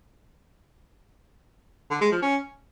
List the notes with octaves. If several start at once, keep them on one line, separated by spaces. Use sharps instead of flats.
D3
G#3
F3
C#4